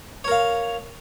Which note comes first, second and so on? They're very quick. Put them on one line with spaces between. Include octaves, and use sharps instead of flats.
C#5 A#4 F5